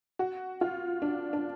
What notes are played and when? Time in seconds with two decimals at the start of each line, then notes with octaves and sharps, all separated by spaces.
0.19 F#4
0.61 F4
1.02 D4
1.33 D4